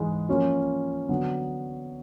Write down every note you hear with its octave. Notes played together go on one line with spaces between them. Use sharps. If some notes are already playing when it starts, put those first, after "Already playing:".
Already playing: G#2 E3 G#3
F3 A#3 C#4 F4
D3 F#3 B3